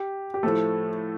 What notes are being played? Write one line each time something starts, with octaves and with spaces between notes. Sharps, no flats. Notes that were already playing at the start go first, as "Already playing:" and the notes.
Already playing: G4
G4
A2 F3 A3 A4